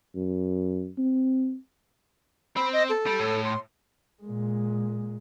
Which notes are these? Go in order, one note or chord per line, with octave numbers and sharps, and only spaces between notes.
F#2
C4
C4 B5
D#5
A4
G3
A2
C6
A#2 G#3